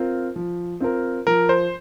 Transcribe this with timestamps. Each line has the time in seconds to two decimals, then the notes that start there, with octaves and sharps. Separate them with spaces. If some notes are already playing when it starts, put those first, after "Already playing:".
Already playing: C4 F4 A#4
0.36 F3
0.80 C4 F4 A#4
1.27 F3 A#4
1.49 C5